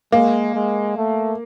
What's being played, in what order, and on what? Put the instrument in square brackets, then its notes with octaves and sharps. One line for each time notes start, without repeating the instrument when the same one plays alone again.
[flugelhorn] G#3 [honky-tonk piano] A#3
[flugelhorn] G#3
A3